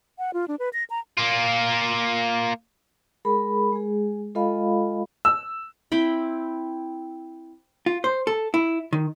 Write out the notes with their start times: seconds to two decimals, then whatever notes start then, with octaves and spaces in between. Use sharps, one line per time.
0.19 F#5
0.34 F4
0.48 D4
0.59 B4
0.73 A#6
0.90 A#5
1.17 A#3 F4
3.25 G#3 G#4 A#4 B5
3.72 G#3 G#4
4.35 G#3 F4 A4 D#5 F5 B5
5.25 E6
5.92 C4 E4 G5 B5
7.86 F4
8.04 C5
8.27 A4
8.54 E4
8.93 D#3